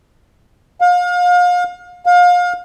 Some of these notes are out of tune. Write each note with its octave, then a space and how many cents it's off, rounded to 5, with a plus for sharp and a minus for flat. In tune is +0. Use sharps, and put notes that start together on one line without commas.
F5 +35
F5 +30